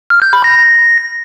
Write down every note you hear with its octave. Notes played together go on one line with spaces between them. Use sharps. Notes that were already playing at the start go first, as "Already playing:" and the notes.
F6
G6
B5
A#6